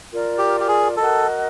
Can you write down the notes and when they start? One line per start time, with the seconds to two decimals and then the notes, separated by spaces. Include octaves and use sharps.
0.10 F4 A#4 D5
0.38 G4
0.60 G4
0.68 G#4
0.97 F#4 A4 A#4 D#5